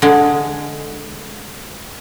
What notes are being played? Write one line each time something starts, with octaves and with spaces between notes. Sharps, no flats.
D3 G#3